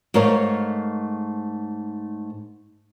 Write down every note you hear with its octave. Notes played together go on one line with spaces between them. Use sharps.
G#2 A3 A#4 C#5 F5